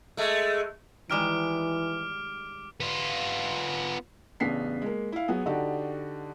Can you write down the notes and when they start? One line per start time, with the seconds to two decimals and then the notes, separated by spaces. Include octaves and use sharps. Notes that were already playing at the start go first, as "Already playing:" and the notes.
0.17 G#3 A3
1.10 D#3 E3 G3 G#3 D6 F6 D7
2.80 B3 F4
4.40 A1 C#3 B3 D4 B6 C7
4.82 G#3 A#3
5.12 E4 F5
5.28 F#3 B3 G#4
5.46 D3 D#4 F#4 G4 D5